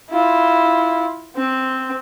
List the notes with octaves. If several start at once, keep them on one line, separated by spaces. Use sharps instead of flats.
E4 F4
C4